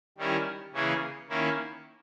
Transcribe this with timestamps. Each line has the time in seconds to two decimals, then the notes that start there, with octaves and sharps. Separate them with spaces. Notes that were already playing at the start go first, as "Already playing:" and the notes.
0.18 D#3 G3 C#4 E4 A#4
0.74 C#3 E3 A#3 C#4 G#4
1.29 D#3 A#3 C#4 E4